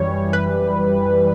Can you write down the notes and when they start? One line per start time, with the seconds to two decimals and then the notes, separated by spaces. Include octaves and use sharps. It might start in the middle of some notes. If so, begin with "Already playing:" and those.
Already playing: F#2 E3 G3 C#5
0.33 B4